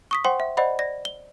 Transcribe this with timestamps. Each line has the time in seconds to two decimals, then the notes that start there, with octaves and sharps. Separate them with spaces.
0.11 C#6 D#6 B6
0.25 C5 F#5 G5 C6
0.40 E5
0.57 C5 D5 D#5 F#5 B5
0.79 D5 A#6
1.05 G7